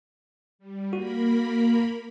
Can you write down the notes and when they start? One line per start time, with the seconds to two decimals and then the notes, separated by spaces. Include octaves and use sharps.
0.59 G3
0.93 A#3 F#4 A#4 B5